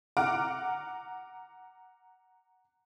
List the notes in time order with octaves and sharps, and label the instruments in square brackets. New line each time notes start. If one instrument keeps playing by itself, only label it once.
[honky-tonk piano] F#5 A#5 D6 F6 D7